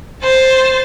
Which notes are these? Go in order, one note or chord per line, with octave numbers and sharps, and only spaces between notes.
C5 A6